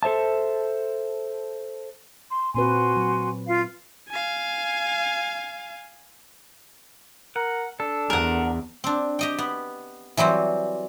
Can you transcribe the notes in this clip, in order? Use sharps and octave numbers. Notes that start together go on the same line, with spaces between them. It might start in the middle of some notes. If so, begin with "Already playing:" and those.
A4 C5 E5 A5
C6
A#2 C4 F#4 B4 G#5 C6
F#3
F4 F5
F5 G#5
A#4 F#5
D4 A4
E2 A#4 F#5
C4 D4
G4 D#5 G5
B3
E3 F#3 G3 C4